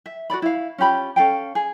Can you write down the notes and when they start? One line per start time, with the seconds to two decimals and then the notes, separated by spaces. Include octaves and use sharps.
0.06 E5
0.30 F#4 A4 D5 B5
0.42 E4 F5
0.78 C#4 F4 G4 B5
1.16 C#4 A4 F5 G5
1.55 G#4